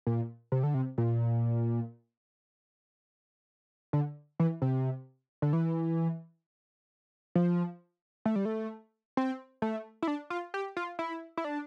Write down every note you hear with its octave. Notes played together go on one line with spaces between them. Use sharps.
A#2
C3
D3
C3
A#2
D3
E3
C3
D3
E3
F3
A3
G3
A3
C4
A3
E4
D4
F4
G4
F4
E4
E4
D4